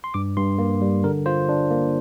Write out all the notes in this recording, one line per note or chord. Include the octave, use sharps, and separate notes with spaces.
C6
G2 D6
G2 C6
A#3
G3
D3 A#4
F4 C5
D4
A#3